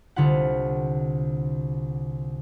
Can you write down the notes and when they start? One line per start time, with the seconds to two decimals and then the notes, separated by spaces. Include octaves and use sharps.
0.16 C2 D3 F4 E5 F#5